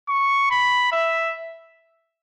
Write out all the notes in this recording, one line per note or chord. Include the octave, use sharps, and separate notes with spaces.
C#6
B5
E5